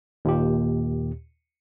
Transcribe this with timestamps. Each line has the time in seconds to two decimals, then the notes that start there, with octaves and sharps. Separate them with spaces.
0.25 D#2 A#2 G4